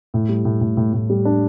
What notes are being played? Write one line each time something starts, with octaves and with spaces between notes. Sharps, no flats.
A2
G3
A2
A2
A2
A2
G3
D4